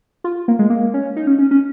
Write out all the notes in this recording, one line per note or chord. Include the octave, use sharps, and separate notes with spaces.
F4
A#3
G#3
A#3
C#4
D#4
C#4
C#4
C#4